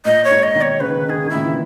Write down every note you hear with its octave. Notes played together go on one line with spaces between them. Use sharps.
A#2 D#5
C#5
G#2
D#5
B2 D#3
C#5
C#3 B4
D#3
C#3
D#3 G#4 B4
C#3
D#3
A#2 C#3 E4
E3